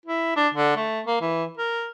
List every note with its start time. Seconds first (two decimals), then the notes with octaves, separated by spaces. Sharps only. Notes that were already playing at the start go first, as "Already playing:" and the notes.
0.05 E4
0.36 D4
0.54 D3
0.77 A3
1.07 A#3
1.21 E3
1.57 A#4